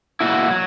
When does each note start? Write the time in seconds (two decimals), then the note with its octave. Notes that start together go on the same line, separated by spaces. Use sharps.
0.20 A#2 E4 F#4
0.51 F#3